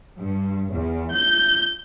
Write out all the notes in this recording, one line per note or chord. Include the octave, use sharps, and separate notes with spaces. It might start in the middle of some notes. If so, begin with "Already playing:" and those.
G2
E2
G6